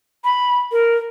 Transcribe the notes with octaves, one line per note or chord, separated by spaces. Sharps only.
B5
A#4